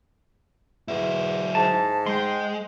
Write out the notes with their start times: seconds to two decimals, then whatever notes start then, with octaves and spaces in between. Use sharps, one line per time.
0.88 E2 F#3 E4
1.55 G#2 A5
2.06 G#3 G5 C6